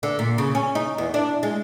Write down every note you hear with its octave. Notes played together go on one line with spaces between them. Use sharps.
D3
A#2
C#3
C#4
D#4
E2
D4
G#3